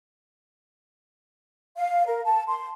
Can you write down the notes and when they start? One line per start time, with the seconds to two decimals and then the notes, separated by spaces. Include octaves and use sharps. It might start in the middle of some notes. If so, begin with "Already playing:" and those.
1.77 F5
2.06 A#4
2.25 A5
2.48 C6